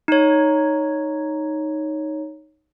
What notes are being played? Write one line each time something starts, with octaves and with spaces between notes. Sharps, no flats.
D#4 C#5